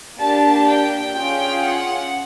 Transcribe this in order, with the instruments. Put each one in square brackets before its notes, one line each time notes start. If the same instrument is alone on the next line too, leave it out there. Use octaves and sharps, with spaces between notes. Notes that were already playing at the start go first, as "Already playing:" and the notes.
[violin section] A#3 D4 G4 A5
G5
C#4 F4 G#4 G5
F#5